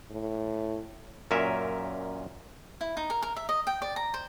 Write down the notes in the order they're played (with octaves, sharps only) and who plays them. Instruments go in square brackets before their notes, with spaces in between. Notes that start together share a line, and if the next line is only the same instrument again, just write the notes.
[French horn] A2
[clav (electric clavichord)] F#2 A#2 C#4 A#4 E5
[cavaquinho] E4
D#4
A#4
A#4
E5
D#5
G5
D5
A#5
C5